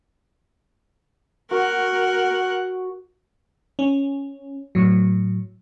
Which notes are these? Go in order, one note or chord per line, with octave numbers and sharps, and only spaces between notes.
F#4 A#4 F#5
C#4
A2 F#3